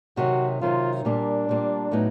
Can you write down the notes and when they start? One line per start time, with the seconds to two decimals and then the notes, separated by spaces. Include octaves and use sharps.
0.17 C3 D#3 F#3 F#4
0.61 C3 D#3 F#3 F4
1.05 A#2 G3 A#3 D4
1.49 A#2 G3 A#3
1.91 A2 F#3 B3 D#4